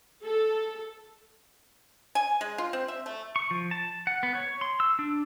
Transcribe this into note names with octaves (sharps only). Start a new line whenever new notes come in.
A4
G#5
G#3
F4
C4
E5
A3
C#6
F3
A5
F#5
B3
C#5
C6
E6
D4